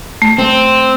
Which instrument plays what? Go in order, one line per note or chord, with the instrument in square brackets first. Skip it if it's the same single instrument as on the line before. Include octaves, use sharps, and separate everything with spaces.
[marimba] A3
[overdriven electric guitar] C4